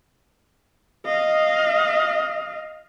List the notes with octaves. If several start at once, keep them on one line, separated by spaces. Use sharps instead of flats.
D#5 F5